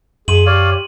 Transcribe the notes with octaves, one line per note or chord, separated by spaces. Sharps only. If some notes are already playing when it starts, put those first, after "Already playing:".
F#2 G#4 C6 D#7 F#7
G4 C#5 D5 F5